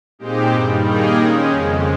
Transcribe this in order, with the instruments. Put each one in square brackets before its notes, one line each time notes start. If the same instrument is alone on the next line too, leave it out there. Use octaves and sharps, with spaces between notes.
[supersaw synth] A#2 G#3 C4 D#4 G4
G2 D#3 G3
D#3 G3 A#3 D#4 G#4
D#3 G#3 C#4
F2 C#3 G#3